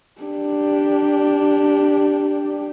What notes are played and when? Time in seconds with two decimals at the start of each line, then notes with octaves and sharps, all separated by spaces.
0.22 D4 G4